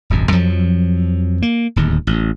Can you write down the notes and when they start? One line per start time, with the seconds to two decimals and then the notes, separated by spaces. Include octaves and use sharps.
0.10 D#1 G#1 F#2
0.32 F2 F3 F#3
1.42 A#3
1.76 D1 D#2
2.07 A1